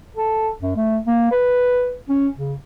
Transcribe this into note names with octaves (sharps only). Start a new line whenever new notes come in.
A4
F#2
A3
A#3
B4
C#4
C#3